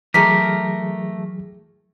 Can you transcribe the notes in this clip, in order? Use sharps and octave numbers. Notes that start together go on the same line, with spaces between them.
E3 F#3 A3 D#4 G4 G#4 A#4 B6